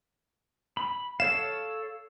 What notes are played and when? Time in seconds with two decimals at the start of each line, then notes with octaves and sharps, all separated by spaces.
0.77 B5
1.20 A4 C#5 F5 E7